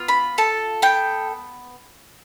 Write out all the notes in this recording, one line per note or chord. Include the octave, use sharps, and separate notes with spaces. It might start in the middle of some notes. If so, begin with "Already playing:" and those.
Already playing: B3 F4
B5
A4 A5
B3 G5